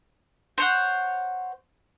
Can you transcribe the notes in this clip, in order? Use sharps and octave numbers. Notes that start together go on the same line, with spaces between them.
C5 C#5 F#5